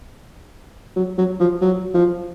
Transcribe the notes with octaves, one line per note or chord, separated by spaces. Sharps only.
F#3
F#3
F3
F#3
F3